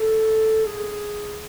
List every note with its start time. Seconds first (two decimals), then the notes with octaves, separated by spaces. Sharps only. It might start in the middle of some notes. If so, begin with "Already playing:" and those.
Already playing: A4
0.66 G#4